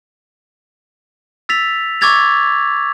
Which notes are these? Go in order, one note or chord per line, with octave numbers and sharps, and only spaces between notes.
E6 A6 B6 F7
C#6 D6 E6 G#6 A6 F7